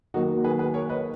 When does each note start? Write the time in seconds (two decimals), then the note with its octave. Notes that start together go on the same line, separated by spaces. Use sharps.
0.14 D#3 F#3 A#3 D#4 F#4
0.44 G#4 B4
0.59 G#4 B4
0.74 A#4 C#5
0.89 B4 D#5